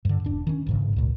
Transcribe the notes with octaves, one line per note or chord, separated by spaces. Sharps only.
G2 D3
E1 D4
D#3 C#4
A1 G#2 C#3
C#2 A#2